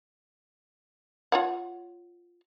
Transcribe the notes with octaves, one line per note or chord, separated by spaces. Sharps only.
F4 C#5 F#5